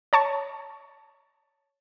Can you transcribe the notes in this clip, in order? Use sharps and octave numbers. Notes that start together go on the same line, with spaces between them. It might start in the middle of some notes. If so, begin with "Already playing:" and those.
C#5 A5 C#6